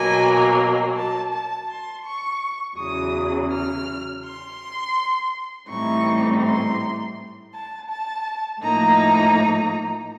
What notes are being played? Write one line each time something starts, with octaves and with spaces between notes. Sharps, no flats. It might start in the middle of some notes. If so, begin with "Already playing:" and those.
Already playing: B2 F#3 A#3 G#5
A5
A5
C6
C#6
E2 C#3 F#3 D#6
F6
C6
A2 E3 G3 C4 D#4 C#6
C6
A5
A5
A2 F3 A#3 D#4 A#5